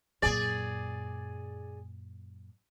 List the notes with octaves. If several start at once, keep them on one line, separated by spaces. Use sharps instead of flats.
F#2 A#2 G#4 D5